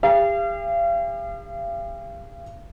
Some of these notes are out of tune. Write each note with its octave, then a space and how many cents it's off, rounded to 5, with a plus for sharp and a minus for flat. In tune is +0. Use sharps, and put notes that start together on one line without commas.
G4 +40 F5 -40